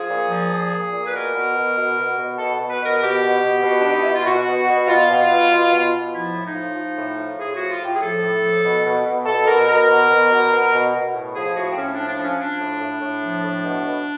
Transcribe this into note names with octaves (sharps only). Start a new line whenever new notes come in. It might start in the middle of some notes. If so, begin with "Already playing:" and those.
Already playing: F3 G#4
A#2
F3
A#2
A#2
A#2
B4
B2 A#4
B2
B2
B2
B2
B2
B2 A4
B2
B4
B2 A#4
B2 G4
B2
B2
B2
B2 D4
D#4
B2 E4
F4
B2 F#4
B2
B2
B2 F4
B2
B2
B2
B2
B2
F3 E4
A2
D#4
F3
F3
A2
F3
A2 G#4
F3 F#4
F4
A2 G4
G#4
F3 A4
A2
F3
B2
B2
B2
B2 A4
B2 A#4
B2 A#4
B2
B2
B2
B2
B2
B2
A2
F3 G#4
A2 F#4
C4
A2 C#4
D4
F3
D4
F3 C#4
F3 D4
A2
A2
A2
F3
A2
B2
B2